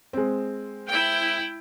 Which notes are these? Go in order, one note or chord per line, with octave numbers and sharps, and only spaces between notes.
G#3 C4
E4 G5